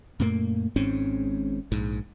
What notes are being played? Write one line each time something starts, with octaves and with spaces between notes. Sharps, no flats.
F#2 A#2 A3 A#3
G#1 G#2 C4 C#4
A#1 G#2